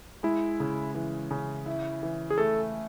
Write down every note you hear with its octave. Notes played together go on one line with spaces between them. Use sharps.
G#3 E4
C#3
E3
C#3
E4
E3
G#4
A3 A4